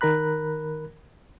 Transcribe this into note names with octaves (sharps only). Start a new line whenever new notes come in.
D#3 A#4 A#5 B5 F#6